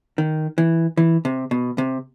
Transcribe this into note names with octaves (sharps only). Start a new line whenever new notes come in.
D#3
E3
E3
C3
B2
C3